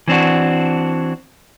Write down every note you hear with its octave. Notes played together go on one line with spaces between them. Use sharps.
E3 C4 D4 F#4